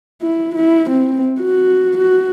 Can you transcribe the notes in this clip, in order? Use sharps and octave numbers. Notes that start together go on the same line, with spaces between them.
E4
E4
C4
F#4
F#4